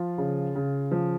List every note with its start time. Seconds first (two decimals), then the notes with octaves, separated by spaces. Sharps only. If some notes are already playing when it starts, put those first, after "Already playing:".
Already playing: F3 F4
0.18 C#3
0.55 C#3
0.91 F3